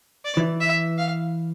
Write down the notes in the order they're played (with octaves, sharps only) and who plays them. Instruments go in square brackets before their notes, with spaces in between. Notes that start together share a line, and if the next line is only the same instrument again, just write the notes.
[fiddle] D5
[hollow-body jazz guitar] E3
[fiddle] E5
F5